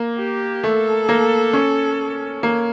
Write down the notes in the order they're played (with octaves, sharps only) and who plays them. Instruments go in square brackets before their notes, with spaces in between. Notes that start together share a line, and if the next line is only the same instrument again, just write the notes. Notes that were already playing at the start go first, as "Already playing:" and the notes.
Already playing: [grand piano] A#3
[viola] G4
[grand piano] A3 [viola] A4
[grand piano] A#3
C#4
A#3